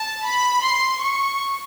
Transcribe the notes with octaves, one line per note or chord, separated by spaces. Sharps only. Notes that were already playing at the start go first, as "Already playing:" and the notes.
Already playing: A5
B5
C6
C#6